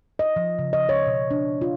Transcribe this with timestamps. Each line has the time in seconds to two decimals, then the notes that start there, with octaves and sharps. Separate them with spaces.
0.19 D#5
0.36 F3
0.59 C#3
0.73 D#5
0.89 C#5
1.06 B2
1.31 D4
1.62 F4